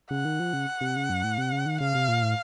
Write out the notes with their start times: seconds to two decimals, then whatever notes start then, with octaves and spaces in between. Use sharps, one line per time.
0.11 C#3 F#5
0.25 D#3
0.40 F3
0.53 C#3
0.81 C3
0.96 C#3
1.10 F#2
1.24 A2
1.38 C3
1.52 C#3
1.66 D#3
1.80 C#3 F5
1.95 C3
2.08 A#2
2.22 A2